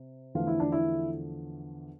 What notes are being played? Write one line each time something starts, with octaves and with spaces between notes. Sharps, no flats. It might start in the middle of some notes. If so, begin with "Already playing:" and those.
Already playing: C3
E2 D3 F3 A3 F4
E4
D4
E4